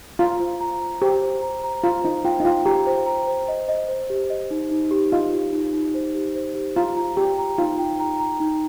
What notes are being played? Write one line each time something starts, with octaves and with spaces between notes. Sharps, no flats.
F4 A#5
C5
A#5
A#5
G4 C5
C5
A#5
A#5
F4 A#5
D#4 C5
F4 G5
D#4
F4 G5
G4 A#5
C5
A#5
C5
D#5
D#5
C5
G4
D#5
D#4
D#4
G4
F4 D#5
G4
D#4
D#4
C5
G4
C5
G4
F4 A#5
A#5
G4 G5
A#5
D#4 F4
G5
A#5
A#5
D#4